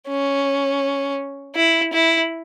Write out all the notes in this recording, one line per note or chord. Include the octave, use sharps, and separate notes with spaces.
C#4
E4
E4